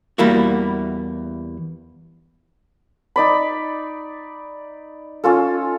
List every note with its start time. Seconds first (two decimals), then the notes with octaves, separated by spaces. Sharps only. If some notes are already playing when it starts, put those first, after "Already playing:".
0.18 E2 G3 A#3 E4 F#4
3.16 D#4 D5 B5
5.24 C#4 F4 A4